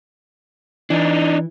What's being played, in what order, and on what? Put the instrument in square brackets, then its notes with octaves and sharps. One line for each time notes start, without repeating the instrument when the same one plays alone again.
[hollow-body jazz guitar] E3 [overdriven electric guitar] D4 D#4